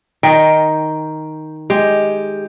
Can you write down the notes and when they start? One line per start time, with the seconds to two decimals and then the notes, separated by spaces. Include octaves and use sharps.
0.23 D#3 D#5 G5
1.70 G#3 G4